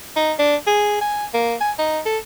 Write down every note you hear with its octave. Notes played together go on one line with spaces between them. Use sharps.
D#4
D4
G#4
G#5
A#3
G#5
D#4
A4